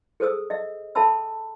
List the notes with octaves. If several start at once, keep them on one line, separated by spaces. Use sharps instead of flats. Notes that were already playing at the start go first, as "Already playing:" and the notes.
G#4 A4 C5 D#6 E6
D#5 E5
A4 E5 G5 A5 B5 E6